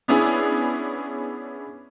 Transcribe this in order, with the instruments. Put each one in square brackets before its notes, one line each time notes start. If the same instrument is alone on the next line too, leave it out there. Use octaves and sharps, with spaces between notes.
[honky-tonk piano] B3 C#4 D4 E4 G#4